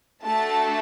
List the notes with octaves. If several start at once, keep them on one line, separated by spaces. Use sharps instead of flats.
A3 D4 F#4 A4 A5